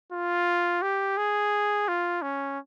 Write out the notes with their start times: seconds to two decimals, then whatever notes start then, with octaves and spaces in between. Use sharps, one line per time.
0.12 F4
0.82 G4
1.17 G#4
1.88 F4
2.22 C#4